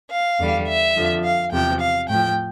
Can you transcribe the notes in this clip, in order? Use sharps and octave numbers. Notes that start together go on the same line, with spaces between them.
F5
E2 D3 G3
E5
F2 D3 F3
F5
E2 C3 F3 G5
F5
A2 F3 G5